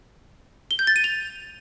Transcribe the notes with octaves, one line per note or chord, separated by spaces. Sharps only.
G7
G6
A6
D#7
F7